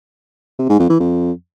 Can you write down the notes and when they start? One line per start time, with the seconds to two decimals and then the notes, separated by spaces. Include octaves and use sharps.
0.59 C3
0.69 G#2
0.79 F2
0.90 E3
1.00 F2